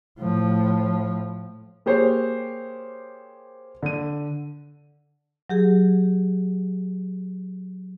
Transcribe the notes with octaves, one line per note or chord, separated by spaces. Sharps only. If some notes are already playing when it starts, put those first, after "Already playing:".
A2 F3
A#3 G4 G#4 C5 C#5
D3 D#7
F#3 G4 G#4